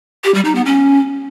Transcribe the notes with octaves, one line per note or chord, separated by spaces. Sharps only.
G4
G3
D#4
B3
C#4